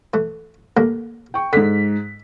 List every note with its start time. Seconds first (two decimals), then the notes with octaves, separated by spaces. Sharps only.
0.14 E3 A3
0.77 D#2 A3 A#3
1.34 G5 C#6
1.53 G#2 D3 B6